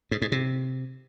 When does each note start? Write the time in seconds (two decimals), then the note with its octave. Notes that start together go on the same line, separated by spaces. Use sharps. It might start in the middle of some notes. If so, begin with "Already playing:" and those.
0.11 G#2
0.22 G#2
0.32 C3